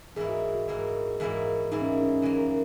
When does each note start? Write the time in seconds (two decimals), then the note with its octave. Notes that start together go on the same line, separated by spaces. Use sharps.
0.16 G#2 E3 A#3 E4 G#4
0.29 F#4
0.42 G#4
0.55 F#4
0.68 G#2 E3 A#3 E4
1.20 G#2 E3 A#3 E4
1.71 G#2 E3 A#3 D#4 E4
1.82 C#4
2.02 C#4
2.22 F#2 E3 A#3